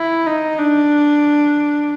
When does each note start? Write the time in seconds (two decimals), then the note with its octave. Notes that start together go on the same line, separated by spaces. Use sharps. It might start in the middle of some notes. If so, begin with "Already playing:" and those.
Already playing: E4
0.27 D#4
0.58 D4